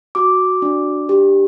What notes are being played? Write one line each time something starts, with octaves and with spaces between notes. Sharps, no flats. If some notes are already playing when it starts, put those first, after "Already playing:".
F#4 D6
D4
G4